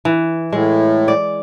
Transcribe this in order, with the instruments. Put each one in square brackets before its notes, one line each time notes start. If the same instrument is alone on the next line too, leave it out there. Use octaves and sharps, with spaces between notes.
[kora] E3
[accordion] A2 [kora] G#3
[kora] D5